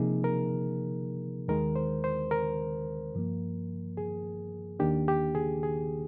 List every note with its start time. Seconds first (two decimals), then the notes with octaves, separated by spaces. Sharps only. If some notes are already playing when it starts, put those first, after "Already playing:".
Already playing: C3 F3 A#3 D#4 G#4
0.24 A#4
1.48 D#2 D#3 G#3 A#4
1.76 C5
2.04 C5
2.31 A#4
3.15 G2 F3 A#3
3.97 G#4
4.79 D#2 D#3 A#3 D4 G4
5.08 G4
5.35 G#4
5.63 G#4